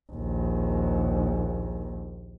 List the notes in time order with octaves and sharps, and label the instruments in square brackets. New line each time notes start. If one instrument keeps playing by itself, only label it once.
[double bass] A#1 D#2